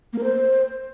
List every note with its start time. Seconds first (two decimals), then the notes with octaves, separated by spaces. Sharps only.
0.13 A#3
0.18 A#4
0.23 C5